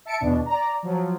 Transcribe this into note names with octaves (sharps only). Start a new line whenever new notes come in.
E5 A5 C#7 D7
E2 B2 D4
D5 A#5
F3 F#3